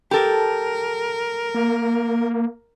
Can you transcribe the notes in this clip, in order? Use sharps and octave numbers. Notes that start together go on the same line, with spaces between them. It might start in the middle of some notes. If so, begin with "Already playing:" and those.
G4 A4 A#4
A#3